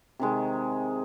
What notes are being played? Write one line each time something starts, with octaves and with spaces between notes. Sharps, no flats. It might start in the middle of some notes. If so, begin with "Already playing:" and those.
C3 D#3 G#3